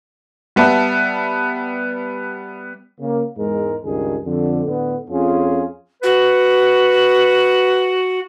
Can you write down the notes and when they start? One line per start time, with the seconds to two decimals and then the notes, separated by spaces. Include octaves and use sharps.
0.56 G3 B3 E5 A5
3.00 C#3 A#3
3.37 E2 G#2 G#3 A#4
3.84 C#2 G2 D#3 G#4
4.25 F2 D3
4.66 A2 D3 B3
5.09 F2 C#4 F4 G#4
6.02 F#4 B4